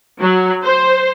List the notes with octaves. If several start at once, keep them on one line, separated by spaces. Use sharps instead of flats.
F#3
C5